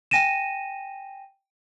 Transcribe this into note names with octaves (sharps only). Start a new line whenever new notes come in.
G5 G#5 A#6 D#7 E7